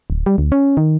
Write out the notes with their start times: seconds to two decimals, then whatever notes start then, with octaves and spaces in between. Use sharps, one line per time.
0.10 D1
0.26 G3
0.38 D2
0.52 C#4
0.77 D#3